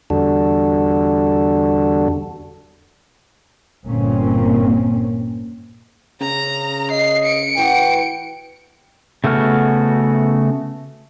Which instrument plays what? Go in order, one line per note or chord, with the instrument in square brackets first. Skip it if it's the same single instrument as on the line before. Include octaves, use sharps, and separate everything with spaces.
[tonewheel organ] E2 D3 G3 D4 F#4 A4
[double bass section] G1 A#2 A#3 C4 C#4
[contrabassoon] C#3 [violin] A#5
[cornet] D#5 [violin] C7
[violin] C#7 D7
[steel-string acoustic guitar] A2 E3 F#4 [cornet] G5
[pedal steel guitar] C#3 A3 B3 F#4 F6